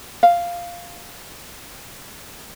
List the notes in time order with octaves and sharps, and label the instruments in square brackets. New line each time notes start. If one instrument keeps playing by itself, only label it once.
[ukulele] F5